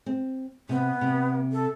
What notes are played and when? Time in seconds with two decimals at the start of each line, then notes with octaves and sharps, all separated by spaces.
0.06 C4
0.69 C3 B3
1.01 C3
1.52 A4